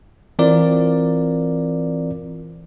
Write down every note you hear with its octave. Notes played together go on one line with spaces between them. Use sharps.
E3 C4 F4 A#4 D5